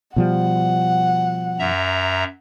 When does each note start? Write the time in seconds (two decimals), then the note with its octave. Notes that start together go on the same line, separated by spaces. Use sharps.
0.16 B2 F3 G3 F#5
1.59 F#2 E5 A#5